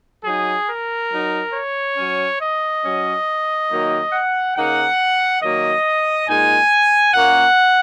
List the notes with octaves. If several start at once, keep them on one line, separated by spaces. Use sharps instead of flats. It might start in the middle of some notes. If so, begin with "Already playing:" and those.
F#3 D#4 G#4
A#4
F#3 D#4
C#5
F#3 C#4
D#5
F#3 C#4
D#3 F#3 A#3 D#4
F#5
C#3 A#3 D#4 F#5
D#3 F#3 A#3 D#5
A#2 G#3 D#4 G#5
A#2 A#3 C#4 F#5